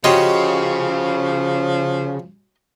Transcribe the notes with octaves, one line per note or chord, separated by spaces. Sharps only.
C#3 F3 C#4 F#4 G4 D#5 C6 C#6